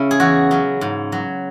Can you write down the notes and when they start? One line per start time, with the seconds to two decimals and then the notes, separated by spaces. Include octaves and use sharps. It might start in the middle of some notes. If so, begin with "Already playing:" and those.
Already playing: C#3 C#4 E4
0.11 G#4
0.20 E2 F#4
0.51 C#3 F#3
0.81 G#2
1.12 F#3